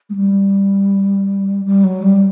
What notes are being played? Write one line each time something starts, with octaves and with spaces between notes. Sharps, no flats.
G#3
G3
G3
F#3
G3